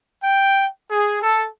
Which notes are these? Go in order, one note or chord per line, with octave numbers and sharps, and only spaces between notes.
G5
G#4
A4